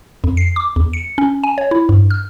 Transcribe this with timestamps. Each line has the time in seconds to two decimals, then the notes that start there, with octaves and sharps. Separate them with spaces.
0.24 F2
0.37 C7
0.56 D6
0.76 E2
0.93 C#7
1.18 C#4
1.44 G#5
1.58 C#5
1.71 E4
1.89 G2
2.11 F6